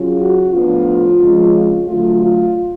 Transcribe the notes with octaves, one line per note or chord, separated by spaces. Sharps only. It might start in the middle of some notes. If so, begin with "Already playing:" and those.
Already playing: C#3 F#3 C#4 F4
F#4
A2 F3 B3 D4 F4
F2 C#3 F3 G#3 C#4
D3 F#3 A3 F4
F4